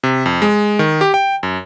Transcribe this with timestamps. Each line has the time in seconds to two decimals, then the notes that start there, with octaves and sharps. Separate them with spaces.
0.03 C3
0.26 F2
0.42 G#3
0.79 D#3
1.01 G4
1.14 G5
1.43 F#2